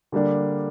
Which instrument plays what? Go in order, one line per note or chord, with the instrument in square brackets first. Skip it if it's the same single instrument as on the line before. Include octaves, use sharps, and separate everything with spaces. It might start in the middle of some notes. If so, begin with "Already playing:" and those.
[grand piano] D3 G3 A#3 D4